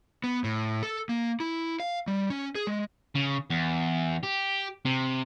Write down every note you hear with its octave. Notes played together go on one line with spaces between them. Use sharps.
B3
A2
A4
A#3
E4
F5
G3
C#4
G#4
G#3
C#3
E2
G4
C3